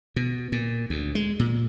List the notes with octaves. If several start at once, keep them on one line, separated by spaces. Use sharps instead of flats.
B2
A#2
D2
G#3
A#2